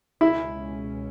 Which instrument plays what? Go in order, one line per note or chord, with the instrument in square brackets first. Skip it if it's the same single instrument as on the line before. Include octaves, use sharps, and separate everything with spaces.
[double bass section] C#2 B2 G#3 C#4 [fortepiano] E4